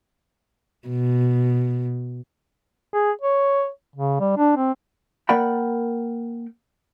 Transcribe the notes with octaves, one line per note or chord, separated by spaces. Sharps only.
B2
G#4
C#5
C#3
G3
D4
C4
A#3 A#4 D5 F#5 G5 B5